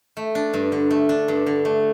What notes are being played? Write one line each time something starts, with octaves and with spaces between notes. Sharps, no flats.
A3
D4
G2
D3
A3
D4
G2
D3
A3